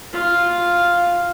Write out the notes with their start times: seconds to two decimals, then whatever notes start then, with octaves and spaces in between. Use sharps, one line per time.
0.13 F4 F5